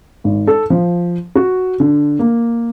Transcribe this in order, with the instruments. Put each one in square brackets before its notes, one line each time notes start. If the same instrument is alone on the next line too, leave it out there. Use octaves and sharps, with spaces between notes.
[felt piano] G#1
A4
F3
F#4
D3
A#3